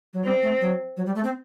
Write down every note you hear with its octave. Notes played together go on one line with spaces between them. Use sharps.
F#3
G3 C4
A3
F#3
F#3
G3
A3
C4